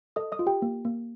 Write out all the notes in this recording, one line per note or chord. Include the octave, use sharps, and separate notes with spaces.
A4 D#5 D#6
D#5 D#6
F4
G4 G5
A#3
A#3